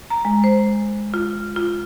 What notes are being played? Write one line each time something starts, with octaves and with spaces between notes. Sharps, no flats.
A#5
G#3
C5
F4
F4